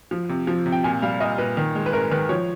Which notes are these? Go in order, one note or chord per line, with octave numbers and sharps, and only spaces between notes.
F3
C3
F3
C3
G5
A#2 G#5
G3 F5
A#2 D#5
A#2 B4
D#3
G#3
B4
G#1 A#4
D#3 B4
F3 C#5